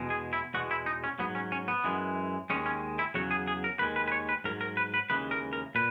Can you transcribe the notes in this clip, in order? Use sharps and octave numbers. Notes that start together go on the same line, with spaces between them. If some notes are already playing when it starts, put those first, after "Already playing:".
Already playing: E2 B2 G#3
G#4
E4
E2 B2 G#3 F#4
E4
D#4
C#4
G#2 F#3 B3
C#4
C#4
B3
F#2 E3 G#3
D#2 D#3 G#3 C#4
C#4
E4
E2 C#3 F#3 F#4
G#4
G#4
A#4
D#2 D#3 G#3 B4
B4
B4
C#5
B4
G#2 F#3 A#4
A#4
B4
B4
D#2 C#3 E3 G#3 B4
A#4
A#4
A#2 B4